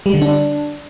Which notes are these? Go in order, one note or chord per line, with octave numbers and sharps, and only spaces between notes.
G3
D3
D4